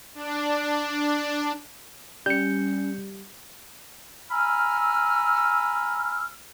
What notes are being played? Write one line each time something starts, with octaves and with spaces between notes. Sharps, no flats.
D4
G3 C#4 G6 C#7
G#5 A#5 B5 E6 F6